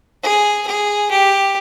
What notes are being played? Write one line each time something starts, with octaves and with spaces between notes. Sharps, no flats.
G#4
G#4
G4